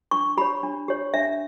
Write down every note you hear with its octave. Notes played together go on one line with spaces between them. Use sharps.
D4 C#6
G4 C#5 B5
D4
G4 C#5
D4 E5